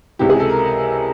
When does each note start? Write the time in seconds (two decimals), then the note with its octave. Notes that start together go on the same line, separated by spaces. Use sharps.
0.19 C#2 C3 E3 G4
0.30 G#4
0.40 A4
0.50 A#4